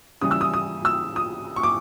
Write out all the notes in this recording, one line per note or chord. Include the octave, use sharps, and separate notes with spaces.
C#3 E3 G3 D#6
E6
D#6
D#6
E6
D#6
C#6
D6